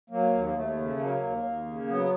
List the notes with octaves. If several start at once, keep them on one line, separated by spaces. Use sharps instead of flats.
F#3 A#3
D#2
A#3
D#2 A3
C#3
F#3 A#3
D#2
D#2
C#3
F#3 B3